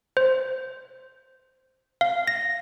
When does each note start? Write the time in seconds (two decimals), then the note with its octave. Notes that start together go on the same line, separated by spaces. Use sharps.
0.17 C5
2.01 F5
2.27 A#6